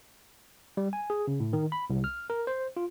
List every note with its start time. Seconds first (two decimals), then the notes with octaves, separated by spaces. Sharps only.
0.77 G3
0.93 G#5
1.10 G#4
1.27 C#3
1.40 A2
1.53 D#3
1.72 B5
1.90 C2
2.04 F6
2.30 A#4
2.47 C5
2.77 F4